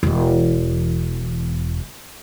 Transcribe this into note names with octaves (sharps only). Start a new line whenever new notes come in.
E1 E2